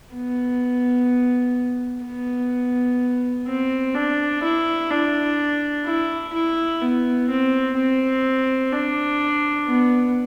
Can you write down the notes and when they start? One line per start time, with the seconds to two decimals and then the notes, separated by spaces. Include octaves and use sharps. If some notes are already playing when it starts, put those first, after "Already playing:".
0.14 B3
2.05 B3
3.47 C4
3.95 D4
4.43 E4
4.91 D4
5.85 E4
6.33 E4
6.81 B3
7.29 C4
7.76 C4
8.73 D4
9.67 B3